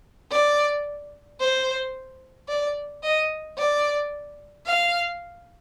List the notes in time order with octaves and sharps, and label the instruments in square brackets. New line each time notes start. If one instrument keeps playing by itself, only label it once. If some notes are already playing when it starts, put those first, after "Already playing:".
[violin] D5
C5
D5
D#5
D5
F5